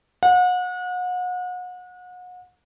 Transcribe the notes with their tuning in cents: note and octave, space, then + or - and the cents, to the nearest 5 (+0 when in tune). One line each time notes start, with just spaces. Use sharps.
F#5 -35